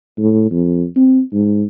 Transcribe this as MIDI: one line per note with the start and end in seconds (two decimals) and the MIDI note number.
0.18 0.51 45
0.52 0.85 41
0.96 1.21 60
1.32 1.65 44